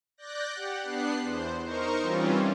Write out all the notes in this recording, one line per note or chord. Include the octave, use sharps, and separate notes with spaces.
D5 F#6 G6 A#6
G4 F#5
B3 D4 F#6 C7
E2 C5
D#4 A#4 C5 C#6
E3 G3 C4 C#4 F4